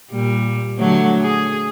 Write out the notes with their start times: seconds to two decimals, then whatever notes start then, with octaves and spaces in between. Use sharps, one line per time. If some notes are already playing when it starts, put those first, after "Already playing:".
0.11 A#2 G3
0.78 D3 F#3 A3
1.21 G#4